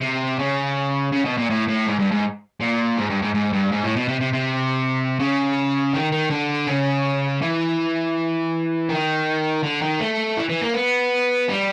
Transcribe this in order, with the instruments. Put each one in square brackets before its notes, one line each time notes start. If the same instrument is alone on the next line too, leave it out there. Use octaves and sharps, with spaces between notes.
[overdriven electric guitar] C3
C#3
C#3
B2
A#2
A2
A2
G#2
G2
G#2
A#2
G#2
G2
G#2
G#2
G2
G#2
A2
B2
C3
C3
C3
C#3
D#3
D#3
D3
C#3
E3
D#3
D3
D#3
A3
E3
E3
A#3
B3
G3